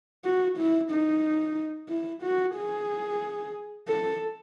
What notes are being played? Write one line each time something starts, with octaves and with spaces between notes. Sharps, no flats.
F#4
E4
D#4
E4
F#4
G#4
A4